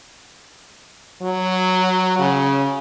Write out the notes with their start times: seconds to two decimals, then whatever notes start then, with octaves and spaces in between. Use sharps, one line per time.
1.22 F#3
2.19 C#3